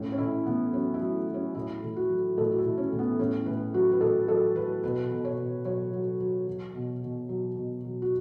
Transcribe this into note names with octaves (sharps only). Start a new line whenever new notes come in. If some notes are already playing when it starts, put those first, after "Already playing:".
Already playing: A2 C#4
C#4
A2 E4
A2 B3
F#3 C#4
E4
F#3
F#3
C#4
A2 E4
A2
F#4
F#3
A2 A4
F#4
E4
A2
C#4
A2
B3
A2 C#4
A2 B4
F#3 F#4
B4
A2 A4
F#3 A4
F#3 B4
B2 B4
B2
C#5
B2
F#3 C#5
F#3
F#3
F#3
B2
B2
F#3
B2
F#3
F#4